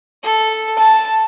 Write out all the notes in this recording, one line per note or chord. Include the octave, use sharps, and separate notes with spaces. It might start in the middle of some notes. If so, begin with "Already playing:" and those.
A4
A5